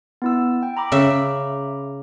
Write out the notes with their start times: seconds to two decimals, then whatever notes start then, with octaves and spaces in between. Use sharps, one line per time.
0.22 B3 E4 E6
0.63 G5
0.77 A#5 B5 D6
0.92 C#3 E5